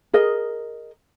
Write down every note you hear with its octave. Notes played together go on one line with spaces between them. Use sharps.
G#4 A#4 D#5